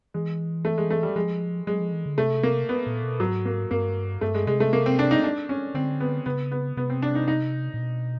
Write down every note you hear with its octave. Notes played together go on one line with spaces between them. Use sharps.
E3 G#3
A3
G#3
A3
G3
F3 G#3
F#3 G#3
F3
E3
D3
C3 A3
A#3
B3
A#2
B2
G#2 F#3
A#3
G2 A#3
G2 A3
G#3
C3 G#3
A3
A#3
C4
D4
D#4
D4
C#4
D3 C4
B3
C#3 B3
B3
C3 B3
C4
D4
D#4
D#4
A#2
B2